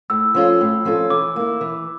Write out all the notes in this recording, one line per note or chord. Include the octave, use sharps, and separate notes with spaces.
A2 E6
F3 C#4 F4 A4
A2
F3 C#4 F4 A4
E3 D6
A#3 E4
E3